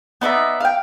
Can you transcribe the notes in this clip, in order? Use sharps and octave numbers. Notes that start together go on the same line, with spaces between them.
B3 D#4 D5 E5
F5 G5